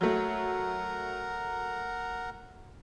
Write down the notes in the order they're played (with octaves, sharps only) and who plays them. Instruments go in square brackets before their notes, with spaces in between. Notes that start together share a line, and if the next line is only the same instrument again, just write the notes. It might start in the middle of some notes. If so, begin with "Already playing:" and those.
[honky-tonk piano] F#3 A3 [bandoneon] A#4 F#5 A#5